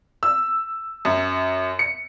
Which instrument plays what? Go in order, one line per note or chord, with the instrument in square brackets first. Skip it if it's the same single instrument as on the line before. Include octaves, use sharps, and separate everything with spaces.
[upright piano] E6
F#2
C#7